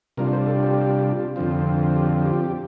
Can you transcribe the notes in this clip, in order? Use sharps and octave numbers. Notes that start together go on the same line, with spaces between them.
C3 G3 D4 F4 A#4
C5
A4
G4
F2 D3 F3 C4 F4
G4
G4